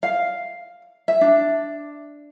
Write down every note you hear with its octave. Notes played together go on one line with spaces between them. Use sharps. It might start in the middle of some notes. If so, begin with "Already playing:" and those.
F5
E5
D4